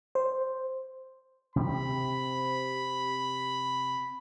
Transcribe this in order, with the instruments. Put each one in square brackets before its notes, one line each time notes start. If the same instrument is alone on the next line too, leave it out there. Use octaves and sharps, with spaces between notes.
[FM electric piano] C5
[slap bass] C3 C4 [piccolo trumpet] B5